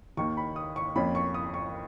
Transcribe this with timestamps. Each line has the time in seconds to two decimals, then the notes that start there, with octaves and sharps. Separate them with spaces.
0.17 D#2 D#3 A#3 C#6
0.37 B5
0.56 D#6
0.76 C#6
0.96 F2 F3 A#3 C#4 B5
1.15 C#6
1.34 D#6
1.54 C#6